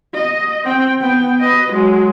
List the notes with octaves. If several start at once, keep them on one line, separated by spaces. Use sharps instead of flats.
D#5
C4 G5
B3 G5
B4 D#5
F#3 G#3